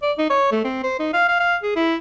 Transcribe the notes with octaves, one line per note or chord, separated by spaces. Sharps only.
D5
D#4
C#5
A3
C4
C5
D#4
F5
F5
F5
G#4
E4